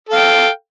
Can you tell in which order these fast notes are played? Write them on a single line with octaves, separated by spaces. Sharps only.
A4 F5 G5